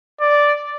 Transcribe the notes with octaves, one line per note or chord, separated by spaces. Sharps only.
D5